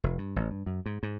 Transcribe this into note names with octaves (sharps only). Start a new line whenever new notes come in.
F1
G2
A1
G2
F#2
G#2
G#2